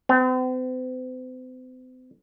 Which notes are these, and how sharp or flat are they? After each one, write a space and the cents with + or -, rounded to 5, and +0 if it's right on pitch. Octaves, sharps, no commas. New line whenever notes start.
C4 -45